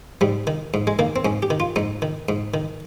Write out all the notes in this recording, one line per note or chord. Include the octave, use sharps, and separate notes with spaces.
G#2 G3
D#3
G#2
G#3
D#3 A#3
C4
G#2 C#4
G4
D#3
F4
G#2 D#4
D#3
G#2
D#3